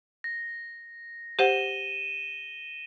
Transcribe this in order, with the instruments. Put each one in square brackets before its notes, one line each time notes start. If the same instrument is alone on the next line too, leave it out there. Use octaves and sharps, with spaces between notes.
[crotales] A#6
[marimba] G4 C5 F#5 [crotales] D#7 E7 G7